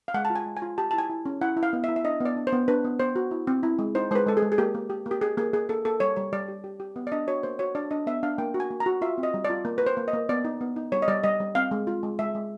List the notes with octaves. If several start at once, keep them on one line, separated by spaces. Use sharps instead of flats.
F5
G#3 F#5
A5
F4
G#5
G#3
G#5
F4
G4 A5
E4 A5
G#5
E4
C#4
E4 F#5
E4
F5
B3
E5
E4
E5
D4 D#5
B3
D5
D4
C5
B3
D4 B4
B3
B3 C5
F#4
E4
C4
E4
G#3
D#4 C5
G#3 B4 C5
G#3 A4
G#4
G#3
G#4
A#3 G4
A#3
G4
A#3
G4
G4 G#4
A#3 G#4
A#3 G#4
A#3 A4
A#3 A4
G3 C#5
G3 C#5
G3 D5
G4
G4
G4
B3
D5
D4 D#5
F#4 C#5
A#3 C5
F#4 C#5
D4 D5
D4 D#5
B3 E5
D4 F5
A#3 G5
F#4
G#5
A#3
A#5
F#4
F4 E5
C4
D#5
G3
D5
F4
A#3
A#3 B4
C5
A#3
D#5
A#3
B3 D5
D#4
B3
D#4
G3 C#5
D#5
G3 D5
G3 D#5
G3
C4 F5
G#3
F4
G#3
G#3 E5
G#3